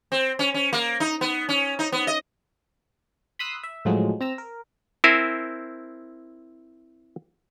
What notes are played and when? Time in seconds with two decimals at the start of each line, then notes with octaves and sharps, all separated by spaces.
0.12 C4
0.39 C#4
0.54 C#4
0.73 A#3
1.00 D#4
1.21 B3
1.49 C#4
1.79 D#4
1.92 B3
2.07 D#5
3.39 B5 C6 D#6 E6 F#6 B6
3.63 E5
3.85 A2 F3 F#3 G#3
4.21 C4 A#5 E6
4.38 A#4
5.04 C4 E4 A#4 C5 G#5